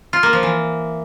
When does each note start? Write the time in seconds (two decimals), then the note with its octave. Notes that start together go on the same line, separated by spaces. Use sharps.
0.13 F4
0.23 A#3
0.33 F3
0.43 E3